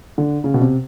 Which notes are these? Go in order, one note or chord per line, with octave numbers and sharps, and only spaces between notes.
D3
C#3
B2
C3